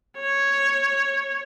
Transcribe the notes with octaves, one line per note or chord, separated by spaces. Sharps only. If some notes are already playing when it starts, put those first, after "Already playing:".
C#5